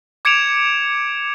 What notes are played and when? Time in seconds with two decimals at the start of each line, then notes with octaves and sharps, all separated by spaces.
0.25 D6 G#6 C#7 D7 E7 F7